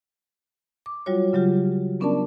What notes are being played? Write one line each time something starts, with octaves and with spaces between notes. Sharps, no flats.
D6
F#3 G3 F4 F#4 C#5
C#3 F#3 F4 G4
B3 C#4 D4 A#4 D5 A5